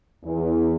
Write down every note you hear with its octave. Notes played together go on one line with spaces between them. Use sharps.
E2